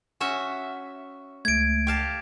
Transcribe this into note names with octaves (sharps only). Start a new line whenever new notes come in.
C#4 F#4 E5
C#2 A3 G#6 D7
G4 F5 A5